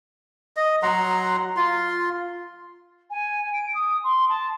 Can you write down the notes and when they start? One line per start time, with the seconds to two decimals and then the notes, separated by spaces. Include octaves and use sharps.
0.57 D#5
0.83 F#3 F#5 A#5 C6
1.57 F4 C6
3.10 G#5
3.53 D7
3.74 D#6
4.04 C6
4.29 A5